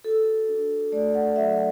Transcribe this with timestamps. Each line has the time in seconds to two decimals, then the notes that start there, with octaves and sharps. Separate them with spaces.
0.04 F#4 A4
0.48 D4
0.92 A3 D5
1.15 F#5
1.36 F#3 E5